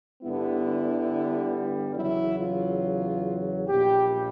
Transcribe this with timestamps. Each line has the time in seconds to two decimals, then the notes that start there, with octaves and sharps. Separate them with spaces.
0.23 G1 G2 D3 G3 B3 E4
1.95 E2 C#3 F#3 E4
2.39 F4
3.68 A#1 A#2 G3 G4